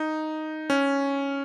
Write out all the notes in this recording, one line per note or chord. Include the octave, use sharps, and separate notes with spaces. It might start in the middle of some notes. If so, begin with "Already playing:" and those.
Already playing: D#4
C#4